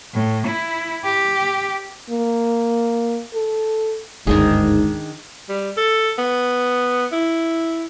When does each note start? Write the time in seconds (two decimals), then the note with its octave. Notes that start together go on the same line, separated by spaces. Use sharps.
0.14 A2
0.47 E4
1.04 G4
2.10 A#3
3.34 A4
4.27 G1 D2 G#2 D#3 D4 G#4
5.49 G3
5.77 A4
6.18 B3
7.12 E4